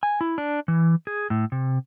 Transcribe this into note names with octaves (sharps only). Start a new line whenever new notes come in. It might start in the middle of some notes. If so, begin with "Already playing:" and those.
G#5
E4
D4
E3
G#4
A2
C3